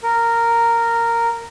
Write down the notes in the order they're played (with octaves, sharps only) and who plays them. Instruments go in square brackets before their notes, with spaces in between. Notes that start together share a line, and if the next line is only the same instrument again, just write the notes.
[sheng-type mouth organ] A#4